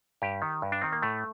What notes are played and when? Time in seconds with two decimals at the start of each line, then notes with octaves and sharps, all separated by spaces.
0.22 G2 G4
0.42 D#3
0.62 G2
0.72 D4
0.81 D#3 C4
0.92 A#3
1.02 A2 A3